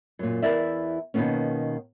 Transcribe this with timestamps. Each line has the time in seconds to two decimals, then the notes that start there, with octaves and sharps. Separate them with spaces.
0.19 F#2 A#2
0.42 E2 D3 E4 A#4 D5 E5
1.14 B2 D#3 E3 A#3 B3 C#4